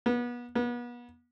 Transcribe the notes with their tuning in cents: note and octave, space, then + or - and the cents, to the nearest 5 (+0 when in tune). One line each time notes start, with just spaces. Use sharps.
B3 -30
B3 -35